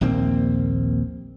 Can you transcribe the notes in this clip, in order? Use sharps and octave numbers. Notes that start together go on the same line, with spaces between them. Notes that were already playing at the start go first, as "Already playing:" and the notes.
A#1 D#2 A#3 C4